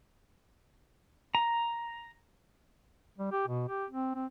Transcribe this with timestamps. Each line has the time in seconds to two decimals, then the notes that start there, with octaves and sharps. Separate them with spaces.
1.35 A#5
3.18 G3
3.32 G4
3.47 B2
3.69 G4
3.90 C4
4.15 C4